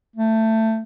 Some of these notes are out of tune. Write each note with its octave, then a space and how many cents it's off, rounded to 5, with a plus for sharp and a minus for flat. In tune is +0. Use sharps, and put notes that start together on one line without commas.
A3 +15